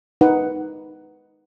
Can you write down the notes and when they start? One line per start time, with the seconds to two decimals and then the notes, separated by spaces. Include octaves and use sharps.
0.21 D#4 B4 F#5